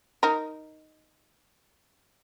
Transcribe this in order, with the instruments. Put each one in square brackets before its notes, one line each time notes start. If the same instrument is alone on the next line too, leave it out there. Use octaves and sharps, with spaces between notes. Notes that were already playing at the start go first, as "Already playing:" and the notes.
[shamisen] D#4 A#4